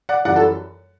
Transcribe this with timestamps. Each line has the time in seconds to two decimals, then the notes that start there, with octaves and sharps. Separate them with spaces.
0.09 D5 F#5
0.25 F#2 E3 G3 D5 F#5
0.35 F#4 A4